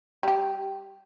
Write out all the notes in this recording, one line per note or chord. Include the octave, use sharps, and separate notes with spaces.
G3 G4